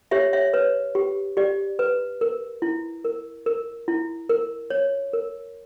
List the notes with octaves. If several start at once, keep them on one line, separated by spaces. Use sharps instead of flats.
G4 C#5 E5
C#5 E5
B4 C#5
G4
G4 D5
B4
A#4
E4
A#4
A#4
E4
A#4
C#5
A#4